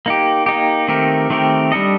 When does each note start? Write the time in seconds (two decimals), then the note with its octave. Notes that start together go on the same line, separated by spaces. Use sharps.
0.06 A#3 D#4 G4
0.46 A#3 D#4 G4
0.88 D#3 A3 C4 G4 A#4
1.30 D#3 A3 C4 G4 A#4
1.72 G3 D4 A4 D#5